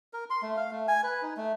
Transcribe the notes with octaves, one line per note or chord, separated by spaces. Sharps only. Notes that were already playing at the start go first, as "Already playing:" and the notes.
A#4
C6
A3
F5
A3
G#5
B4
D#4
A3